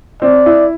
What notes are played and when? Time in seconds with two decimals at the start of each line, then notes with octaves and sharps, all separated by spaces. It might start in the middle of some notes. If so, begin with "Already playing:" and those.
0.22 C4 D5
0.46 E4